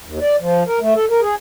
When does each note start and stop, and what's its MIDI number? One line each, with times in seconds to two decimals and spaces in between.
0.05 0.19 39
0.21 0.36 74
0.40 0.63 53
0.67 0.79 70
0.80 0.94 57
0.95 1.05 69
1.10 1.20 70
1.21 1.35 68